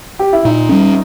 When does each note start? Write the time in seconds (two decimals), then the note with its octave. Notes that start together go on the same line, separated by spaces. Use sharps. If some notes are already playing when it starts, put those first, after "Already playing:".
0.19 G4
0.33 E4
0.45 A#2 D#4
0.69 G3 C#4